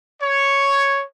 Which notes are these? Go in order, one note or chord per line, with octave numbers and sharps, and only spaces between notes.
C#5